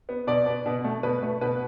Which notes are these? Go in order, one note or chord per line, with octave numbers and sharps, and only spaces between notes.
B3
B2 D5
B3
B2
A3
B2 B4
A3
B2 B4